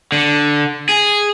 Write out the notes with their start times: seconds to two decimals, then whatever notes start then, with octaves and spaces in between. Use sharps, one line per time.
0.12 D3
0.89 G#4